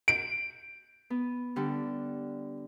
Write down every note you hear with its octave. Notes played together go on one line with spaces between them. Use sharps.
D7
B3
D3 G3